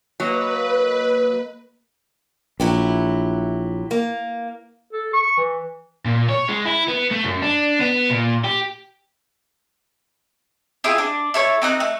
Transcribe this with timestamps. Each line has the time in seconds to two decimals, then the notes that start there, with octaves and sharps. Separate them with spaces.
0.20 F#3 A#3 B4 D#5
2.60 A#1 F#3 E4 G4
3.91 A#3
4.93 A4
5.14 C#6
5.37 E3
6.05 A#2
6.29 C#5
6.49 G#3
6.65 E4
6.88 B3
7.11 A3
7.24 F#2
7.42 D4
7.81 B3
8.11 A#2
8.45 G4
10.84 E4 F4 G#4 G5
10.98 D4
11.34 E4 A4 C#5
11.62 C4 D#4 G5 F#6
11.80 A3